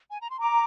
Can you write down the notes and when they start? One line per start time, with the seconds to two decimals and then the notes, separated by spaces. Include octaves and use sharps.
0.11 G#5
0.21 A#5
0.30 C6
0.40 A#5 D6